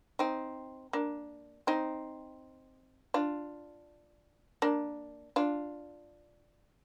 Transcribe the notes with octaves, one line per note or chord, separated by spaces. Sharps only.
C4 D#4
A#3 D4
C4 D#4
D4 F4
A#3 D4
D4 F4